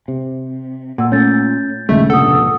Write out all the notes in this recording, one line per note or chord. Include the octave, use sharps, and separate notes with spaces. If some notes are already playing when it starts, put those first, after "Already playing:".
C3
A#2 F#5 E6
A3 C#4 G6 A6
A#1 D#2 C#3 G#3 A3
F1 A#1 G2 A4 F#5 D#6